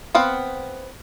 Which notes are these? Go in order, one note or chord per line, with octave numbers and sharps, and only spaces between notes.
B3 C4 F5 F#5